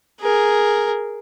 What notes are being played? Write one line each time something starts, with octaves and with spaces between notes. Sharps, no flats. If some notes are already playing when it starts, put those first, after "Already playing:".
G#4 A#4